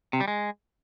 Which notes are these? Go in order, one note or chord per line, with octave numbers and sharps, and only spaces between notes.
C3
G3
G#3